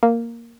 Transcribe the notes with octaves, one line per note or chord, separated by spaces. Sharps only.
A#3